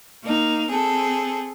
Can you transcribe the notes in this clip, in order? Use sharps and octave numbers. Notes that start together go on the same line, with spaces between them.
A#3 D#4
C4 G#4 A4